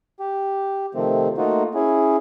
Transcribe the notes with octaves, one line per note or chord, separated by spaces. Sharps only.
G4
C3 D#3 F3 A3 C4
A3 A#3 D#4 F4 F#4
C#4 E4 G#4